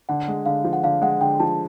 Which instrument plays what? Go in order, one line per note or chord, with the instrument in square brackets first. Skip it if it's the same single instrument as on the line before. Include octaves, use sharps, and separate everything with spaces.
[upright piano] D3 [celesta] F#5
[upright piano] G#3
[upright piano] D3 [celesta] F5
[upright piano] F3
[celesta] F#5
[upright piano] D3 [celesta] F5
[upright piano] G#3 [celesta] F#5
[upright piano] D3 [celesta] G5
[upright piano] F3 [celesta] A5